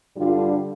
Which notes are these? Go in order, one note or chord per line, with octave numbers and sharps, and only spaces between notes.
G2 D3 G3 D4 F4